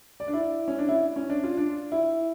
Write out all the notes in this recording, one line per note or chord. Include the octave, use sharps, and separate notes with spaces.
D5
D4
E4
C#4
D4
E4
C#4
D4
F4
D4
E4